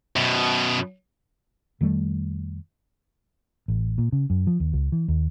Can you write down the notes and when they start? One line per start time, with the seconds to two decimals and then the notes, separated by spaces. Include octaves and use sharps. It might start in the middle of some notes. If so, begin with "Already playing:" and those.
0.16 F#2 B2
1.81 F2 D#3 G3 A3
3.68 A1
3.98 A#2
4.12 C#3
4.30 F#2
4.47 F3
4.60 D#2
4.73 C#2
4.92 E3
5.08 D#2